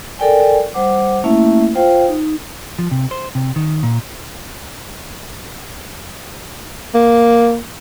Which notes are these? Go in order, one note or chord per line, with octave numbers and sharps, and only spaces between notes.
A4 A#4 D5 G5 G#5
G3 C5 F#5 D6
A3 A#3 C#4 E4 E5
F4 C5 F5 G5
D#4
F3
C3
C5
C3
D#3
A#2
A#3